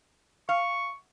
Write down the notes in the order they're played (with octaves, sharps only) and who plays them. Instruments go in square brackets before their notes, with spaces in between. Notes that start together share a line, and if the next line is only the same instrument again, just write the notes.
[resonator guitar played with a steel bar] F5 [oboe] C#6